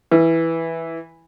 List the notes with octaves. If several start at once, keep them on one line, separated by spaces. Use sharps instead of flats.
E3 B4